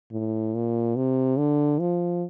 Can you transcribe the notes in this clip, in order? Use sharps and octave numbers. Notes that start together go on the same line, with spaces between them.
A2
A#2
C3
D3
F3